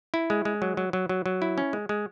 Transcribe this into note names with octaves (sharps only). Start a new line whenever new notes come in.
E4
G#3
G#3
F#3
F#3
F#3
F#3
F#3
E4
C#4
G#3
G#3